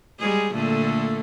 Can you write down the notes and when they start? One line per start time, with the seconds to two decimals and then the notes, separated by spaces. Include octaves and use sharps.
0.19 G3 G#3 G#4
0.54 A#2 D3 A3